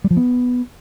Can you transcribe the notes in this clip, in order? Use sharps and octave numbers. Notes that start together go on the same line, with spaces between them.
G3
F3
B3